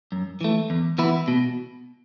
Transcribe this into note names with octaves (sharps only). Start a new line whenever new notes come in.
F#2
E3 A3
E2
E3 B3 E4
B2